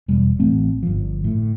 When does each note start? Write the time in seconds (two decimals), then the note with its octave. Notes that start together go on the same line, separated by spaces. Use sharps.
0.08 E1 G3
0.39 A1 A3 C4
0.83 G1 F3
1.24 A2